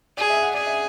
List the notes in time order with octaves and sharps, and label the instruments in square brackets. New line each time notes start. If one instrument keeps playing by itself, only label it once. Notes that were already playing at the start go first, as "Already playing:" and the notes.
[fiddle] G#4 [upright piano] D5
[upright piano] E5
F#5
[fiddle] G#4 [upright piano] D5
[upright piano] E5